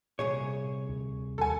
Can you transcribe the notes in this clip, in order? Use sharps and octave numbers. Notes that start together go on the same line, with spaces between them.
C2 A#2 G#4 C#5
D2
D#2 A4 G#5